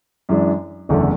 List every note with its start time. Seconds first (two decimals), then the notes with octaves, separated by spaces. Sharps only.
0.29 F#2 E3 G#3 D4
0.89 F#1 E2 D3 A3